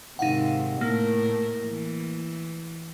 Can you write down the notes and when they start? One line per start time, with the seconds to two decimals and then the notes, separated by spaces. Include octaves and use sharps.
0.19 G#2 C3 D#3 D#4 F5 F#5
0.81 A2 A3 A#3 A#4
1.68 E3